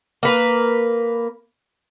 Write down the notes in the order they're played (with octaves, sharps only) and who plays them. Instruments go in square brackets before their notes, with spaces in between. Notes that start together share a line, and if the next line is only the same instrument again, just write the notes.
[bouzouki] A#3 B4